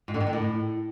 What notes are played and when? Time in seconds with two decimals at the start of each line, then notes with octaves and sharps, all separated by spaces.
0.08 G#2
0.14 D3
0.20 D#3
0.27 D3
0.33 A2